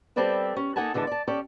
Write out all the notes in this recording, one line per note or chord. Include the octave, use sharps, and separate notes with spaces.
G3 C4 A4 B4 D5 E5
C#4
A#3 D#4 A4 F#5 G#5 A5
E2 D3 E3 G#3 A5
D5 A5
C#4 G4 A4 D5